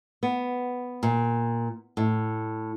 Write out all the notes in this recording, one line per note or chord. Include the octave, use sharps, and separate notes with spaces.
B3
A#2
A2